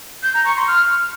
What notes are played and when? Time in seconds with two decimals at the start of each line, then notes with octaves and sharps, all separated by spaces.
0.23 G6
0.34 A#5
0.45 C#6
0.56 C6
0.68 F6